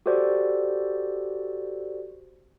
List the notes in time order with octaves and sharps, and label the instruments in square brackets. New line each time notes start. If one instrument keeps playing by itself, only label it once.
[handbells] F#4 G4 A4 C5 D5